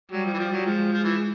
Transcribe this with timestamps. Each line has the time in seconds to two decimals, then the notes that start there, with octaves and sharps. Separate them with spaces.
0.11 F#3 G3
0.25 F3
0.33 E3
0.38 F3
0.52 F#3
0.65 F3 G#3
0.92 F3
1.04 E3